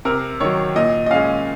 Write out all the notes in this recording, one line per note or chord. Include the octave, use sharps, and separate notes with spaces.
C3 A#4
D#3 F#3 C#5
A#2 D#5
D#5
G#3 C#4 F5